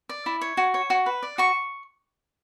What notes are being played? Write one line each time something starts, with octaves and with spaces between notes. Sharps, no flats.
D5
E4
C#5
F#4
C#5
F#4
B4
D5
F#4 C#6